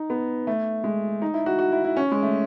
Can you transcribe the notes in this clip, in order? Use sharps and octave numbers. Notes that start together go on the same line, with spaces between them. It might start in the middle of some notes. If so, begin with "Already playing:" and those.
Already playing: D#4
B3
A3
G#3
D#4
E4
F#4
F#4
E4
E4
C#4
G#3
A3